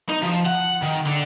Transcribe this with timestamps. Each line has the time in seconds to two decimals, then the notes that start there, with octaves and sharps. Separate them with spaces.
0.10 D#4
0.23 F3
0.46 F#5
0.83 D#3
1.07 D3